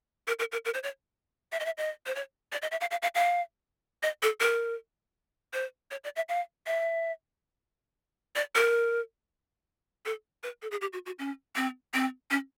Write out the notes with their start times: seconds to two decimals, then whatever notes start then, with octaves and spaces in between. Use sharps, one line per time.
0.28 A#4
0.39 A#4
0.52 A#4
0.65 A#4
0.74 C5
0.83 C#5
1.52 E5
1.60 D#5
1.65 E5
1.78 D#5
2.06 C5
2.15 C#5
2.52 D5
2.62 D#5
2.71 E5
2.81 F5
2.91 F5
3.02 F5
3.15 F5
4.03 D#5
4.23 A4
4.41 A#4
5.53 C5
5.91 C#5
6.04 D5
6.16 E5
6.29 F5
6.66 E5
8.36 D5
8.55 A#4
10.06 A4
10.43 B4
10.62 A4
10.71 G#4
10.81 G4
10.93 F#4
11.06 F#4
11.19 C#4
11.56 C4
11.94 C4
12.31 C#4